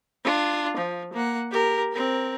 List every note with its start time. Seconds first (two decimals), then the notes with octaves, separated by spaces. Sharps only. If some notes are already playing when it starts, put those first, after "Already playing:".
0.24 D4 F4
0.77 F3
1.13 A#3 F#5
1.51 G4 A#4
1.92 C4 A#4